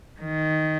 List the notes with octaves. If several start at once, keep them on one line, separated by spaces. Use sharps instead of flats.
D#3